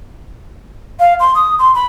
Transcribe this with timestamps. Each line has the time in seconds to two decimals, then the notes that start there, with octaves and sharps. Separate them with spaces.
1.00 F5
1.20 C6
1.35 D#6
1.59 C6
1.75 B5